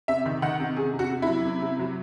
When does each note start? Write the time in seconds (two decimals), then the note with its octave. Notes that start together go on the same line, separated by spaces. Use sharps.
0.08 C3 E5
0.26 D#3
0.42 D#3 F#5
0.60 C3
0.76 C3 G#4
0.93 C3
0.99 F#4
1.10 C3
1.22 E4
1.28 F#3
1.45 C3
1.62 C3
1.80 F#3